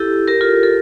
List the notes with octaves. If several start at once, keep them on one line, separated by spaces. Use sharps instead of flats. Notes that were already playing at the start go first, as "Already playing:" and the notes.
Already playing: E4 G4 A4
G4 A#4
F4 A4
A4